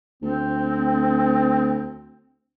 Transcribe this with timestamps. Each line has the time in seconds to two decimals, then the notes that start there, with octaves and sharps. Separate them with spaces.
0.23 D2 C4